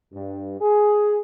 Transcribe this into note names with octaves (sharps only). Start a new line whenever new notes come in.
G2
G#4